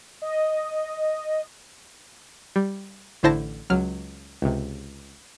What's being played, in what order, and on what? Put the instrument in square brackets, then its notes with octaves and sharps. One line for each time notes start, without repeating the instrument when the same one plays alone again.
[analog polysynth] D#5
[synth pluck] G3
A1 D3 E4 C5 A5 A#6
C#2 F#3 F6
C#2 C3